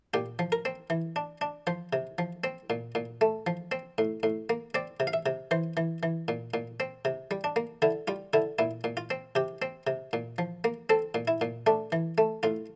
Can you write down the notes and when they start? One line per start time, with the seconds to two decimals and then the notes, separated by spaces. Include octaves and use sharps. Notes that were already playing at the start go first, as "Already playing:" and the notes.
0.14 A#2 G4
0.39 F3
0.52 A#4
0.65 C4
0.90 E3
1.16 D4
1.41 D4
1.67 F3 C5
1.93 C3
2.18 F3
2.44 C4
2.70 A#2
2.95 A#2
3.21 A3
3.47 F3
3.72 C4
3.98 A2
4.23 A2
4.50 A#3
4.75 C4 D5
5.00 C3
5.07 F5
5.13 E5
5.26 C3
5.51 E3 C5
5.77 E3
6.03 E3
6.28 A#2
6.54 A#2
6.80 C4
7.05 C3
7.31 G3
7.44 D4
7.56 A#3
7.82 D3 E4
8.08 G3 F4
8.33 D3 E4
8.59 A#2 E4
8.84 A#2
8.97 F4
9.10 C4
9.35 C3 G4
9.62 C4
9.87 C3
10.13 A#2
10.38 F3
10.64 A#3
10.90 C4 A4
11.15 A#2
11.28 E4
11.41 A#2
11.66 A3 D4
11.92 E3
12.18 A3
12.43 A2 F4